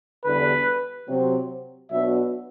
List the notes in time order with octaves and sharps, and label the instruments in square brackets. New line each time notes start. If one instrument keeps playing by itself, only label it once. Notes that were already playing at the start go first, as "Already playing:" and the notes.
[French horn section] E2 D3 G3 [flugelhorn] B4
[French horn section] C3 F#3 C4
[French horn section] B2 F#3 B3 D4 F#4 [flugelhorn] E5